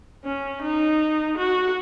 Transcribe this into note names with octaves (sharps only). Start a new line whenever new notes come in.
C#4
D#4
F#4